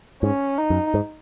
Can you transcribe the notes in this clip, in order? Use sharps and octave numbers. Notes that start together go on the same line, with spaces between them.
G#2 C#4
D#4
F#2
G#2